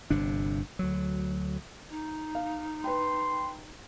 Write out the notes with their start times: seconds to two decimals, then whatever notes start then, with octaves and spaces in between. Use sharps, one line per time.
0.10 G1 C3 D4
0.79 D2 F#3
1.90 D#4
2.35 F5
2.84 B4 G5 C6